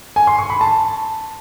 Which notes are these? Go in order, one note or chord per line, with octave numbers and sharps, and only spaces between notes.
G#5
C6
C#6
B5
A5